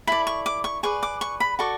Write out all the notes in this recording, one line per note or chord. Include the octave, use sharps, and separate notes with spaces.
E4 A4 D5 B5
C#6
D6
C#6
G#4 B4 D5 C#6
D6
C#6
B5
F#4 A4 D5 C#6